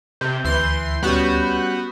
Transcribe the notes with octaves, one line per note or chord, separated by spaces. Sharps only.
C3 G6
D2 E3 C6
G3 B3 C#4 F#4